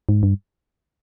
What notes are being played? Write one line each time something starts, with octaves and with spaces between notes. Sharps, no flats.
G#2
G2